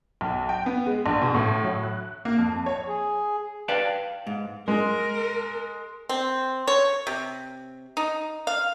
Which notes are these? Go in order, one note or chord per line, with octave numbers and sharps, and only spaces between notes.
B1
G5
B3
G#3
A#1
B2
A2
F#3
F#6
A#3
F2
C#5
G#4
B4 D5 F5 G5 A5
G#2
G#3 A#4
C4
C#5
C3
D#4
F5